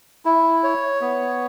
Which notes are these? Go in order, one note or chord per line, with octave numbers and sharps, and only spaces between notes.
E4
C#5
B3